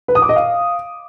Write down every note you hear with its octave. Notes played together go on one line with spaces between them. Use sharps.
B4
D#6
D6
D#5
F5